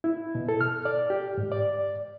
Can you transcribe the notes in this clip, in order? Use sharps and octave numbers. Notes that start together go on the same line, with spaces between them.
E4
B2
A4
F6
D5
G4
G#2
D5